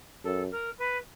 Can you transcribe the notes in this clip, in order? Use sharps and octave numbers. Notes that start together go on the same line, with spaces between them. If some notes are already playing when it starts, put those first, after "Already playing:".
F#2 A4
A#4
B4